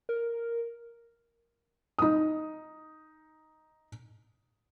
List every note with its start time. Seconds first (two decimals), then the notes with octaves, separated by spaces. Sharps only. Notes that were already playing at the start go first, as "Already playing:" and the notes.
0.09 A#4
1.99 D#4 D#6